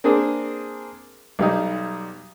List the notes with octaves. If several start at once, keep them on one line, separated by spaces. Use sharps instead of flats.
A#3 C4 D4 G#4
B1 G3 D#4